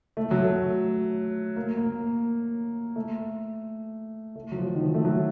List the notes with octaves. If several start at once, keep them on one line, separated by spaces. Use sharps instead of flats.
A3
F#3
A3
A#3
A#3
A3
A3
F#3
F3
D#3
F3
A3
F#3